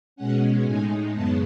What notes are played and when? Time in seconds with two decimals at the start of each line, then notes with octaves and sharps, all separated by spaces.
0.16 B2 G#3 C#4 F#5
0.64 A2 G#3 D#4 G#5
1.13 F#2 C#3 G#3 B3 A5